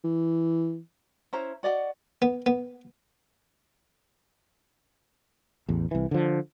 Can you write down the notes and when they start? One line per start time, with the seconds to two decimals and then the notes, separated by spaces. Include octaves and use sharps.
0.04 E3
1.33 C#4 E4 C5 A#5
1.63 F#4 D5 D#5 F#5
2.22 B3
2.46 B3
5.68 A1 E2
5.91 C2 E3
6.11 D3 F3